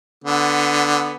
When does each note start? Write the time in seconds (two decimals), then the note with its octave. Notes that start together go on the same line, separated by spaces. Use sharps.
0.24 D3 B3